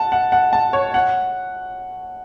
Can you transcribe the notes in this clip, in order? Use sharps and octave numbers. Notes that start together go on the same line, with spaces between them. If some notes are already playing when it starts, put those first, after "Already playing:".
Already playing: F#5 A5
F#5
F#5
A5
C#5
F#5